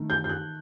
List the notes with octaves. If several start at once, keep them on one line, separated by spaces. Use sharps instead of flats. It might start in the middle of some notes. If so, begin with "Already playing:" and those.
Already playing: D#3 A3
G6
G6
F#6